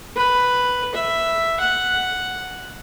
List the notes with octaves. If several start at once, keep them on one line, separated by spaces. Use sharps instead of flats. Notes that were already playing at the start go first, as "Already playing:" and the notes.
B4
E5
F#5